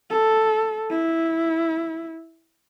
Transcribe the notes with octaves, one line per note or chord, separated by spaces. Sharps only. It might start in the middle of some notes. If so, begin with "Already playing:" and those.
A4
E4